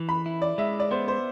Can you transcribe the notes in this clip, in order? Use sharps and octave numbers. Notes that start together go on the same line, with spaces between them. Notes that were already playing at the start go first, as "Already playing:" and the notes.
Already playing: E3
B5
E4
D5
G#3 E5
D5
B3 C5
C5